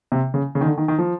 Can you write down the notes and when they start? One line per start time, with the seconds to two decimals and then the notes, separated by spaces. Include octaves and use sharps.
0.12 C3
0.34 C#3
0.55 C#3
0.61 D#3
0.66 D3
0.78 D#3
0.88 D#3
0.99 F3